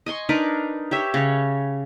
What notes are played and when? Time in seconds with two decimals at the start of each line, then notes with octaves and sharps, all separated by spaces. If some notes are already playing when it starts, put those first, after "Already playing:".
0.06 D#5 G#5 C6 C#6
0.29 D4 D#4 A#4 B4
0.91 G4 C#5 E5
1.14 C#3 C#5